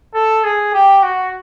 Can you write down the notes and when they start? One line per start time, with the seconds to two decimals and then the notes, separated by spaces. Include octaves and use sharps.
0.15 A4
0.44 G#4
0.74 G4
1.03 F#4